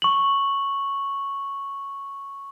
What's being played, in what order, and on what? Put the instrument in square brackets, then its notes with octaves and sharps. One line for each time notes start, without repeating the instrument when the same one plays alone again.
[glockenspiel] C#6 F#7